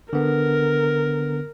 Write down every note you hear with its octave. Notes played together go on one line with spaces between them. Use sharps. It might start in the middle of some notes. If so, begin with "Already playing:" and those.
D3 B3 A#4